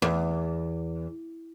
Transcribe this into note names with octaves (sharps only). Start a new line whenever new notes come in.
E2